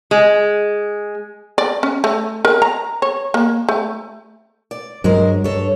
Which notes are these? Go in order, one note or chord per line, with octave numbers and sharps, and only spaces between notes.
G#3
D5
C#4
A3
A#4
A#5
C#5
A#3
A3
D5
G2 F#3 G#3 A#4 C5
G2 A4 C#5